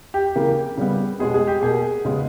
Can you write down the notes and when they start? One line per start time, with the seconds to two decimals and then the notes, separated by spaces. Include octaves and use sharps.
0.14 G4
0.36 C#3 E3 A#3
0.77 C#3 G3 B3
1.19 B2 G#3 B3 G#4
1.34 G#4
1.47 G4
1.62 B2 A#3 G#4
2.05 C#3 G#3 B3